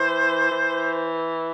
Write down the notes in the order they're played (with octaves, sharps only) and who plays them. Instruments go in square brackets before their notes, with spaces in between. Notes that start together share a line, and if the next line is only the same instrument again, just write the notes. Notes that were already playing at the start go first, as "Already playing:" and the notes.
Already playing: [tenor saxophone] E3 [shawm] C5
[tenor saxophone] E3